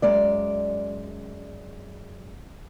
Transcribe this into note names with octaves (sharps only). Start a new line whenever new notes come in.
F#2 G#3 D5